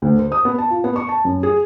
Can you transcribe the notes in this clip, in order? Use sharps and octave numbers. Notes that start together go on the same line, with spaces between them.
D2
C5
D#6
B3
A5
F4
B3
C#6
A5
F#2
G#4